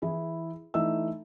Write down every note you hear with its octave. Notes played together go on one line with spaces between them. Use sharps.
E3 E4 G#4
E3 A3 D#4 E5 E6